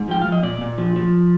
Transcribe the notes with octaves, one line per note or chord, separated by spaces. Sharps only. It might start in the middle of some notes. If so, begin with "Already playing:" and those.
Already playing: G#2
F3 G5
F3 F5
D#5
A#2 D5
A#2
F3
F3